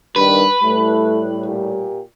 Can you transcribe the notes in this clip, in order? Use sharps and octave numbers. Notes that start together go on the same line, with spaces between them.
G2 D#3 B4
A2 G3 A3
A#2 G4